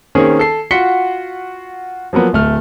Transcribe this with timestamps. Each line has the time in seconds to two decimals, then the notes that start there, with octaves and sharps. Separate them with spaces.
0.15 D#3 A#3 C4 C#4 G#4
0.39 A4 C7
0.71 F4 F#4 F#5 B6 C#7 G7
2.13 F3 F#3 A#3 B3
2.33 D1 A3 F6